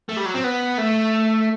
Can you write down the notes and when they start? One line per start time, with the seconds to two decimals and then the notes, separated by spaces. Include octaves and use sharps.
0.09 A3
0.17 G3
0.25 F#3
0.34 C4
0.44 B3
0.78 A3